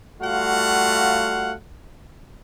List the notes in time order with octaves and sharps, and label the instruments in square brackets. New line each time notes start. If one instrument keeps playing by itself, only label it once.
[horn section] G3 A3 F4 F#4 F5 F#5